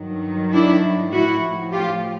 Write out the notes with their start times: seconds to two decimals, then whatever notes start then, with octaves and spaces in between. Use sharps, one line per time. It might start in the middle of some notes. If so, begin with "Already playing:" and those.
Already playing: G2 D#3 F#3
0.53 D4 E4
1.13 A2 F3 E4 F#4
1.73 F4 G4